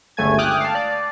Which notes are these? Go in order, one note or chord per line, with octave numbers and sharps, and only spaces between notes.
G1 C#2 A3 G#5 G#6
G5 D6 D#6 F6 F#6
F5 A5
D5